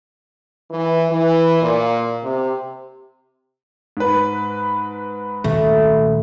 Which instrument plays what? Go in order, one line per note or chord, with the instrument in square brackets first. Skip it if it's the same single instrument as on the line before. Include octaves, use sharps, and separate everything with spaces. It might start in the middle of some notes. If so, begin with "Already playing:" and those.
[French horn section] E3
E3
A#2
C3
[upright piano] G#2 B4
[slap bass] A#2 D#3 C#4 [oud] A3